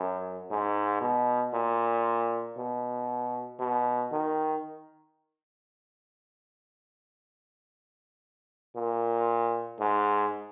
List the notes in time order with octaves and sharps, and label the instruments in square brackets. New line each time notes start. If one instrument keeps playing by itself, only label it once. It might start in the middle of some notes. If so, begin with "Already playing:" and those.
Already playing: [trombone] F#2
G#2
B2
A#2
B2
B2
D#3
A#2
G#2